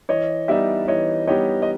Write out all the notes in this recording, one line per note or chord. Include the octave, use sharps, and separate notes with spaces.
E3 C#5 D#5
G3 B3 D#4 G4 D5 E5
E3 C#5 D#5
G3 B3 D#4 G4 C#5 D#5
D#5